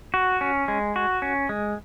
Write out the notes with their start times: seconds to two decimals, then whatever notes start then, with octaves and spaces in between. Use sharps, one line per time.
0.14 F#4
0.41 C#4
0.68 G#3
0.96 F#4
1.22 C#4
1.49 G#3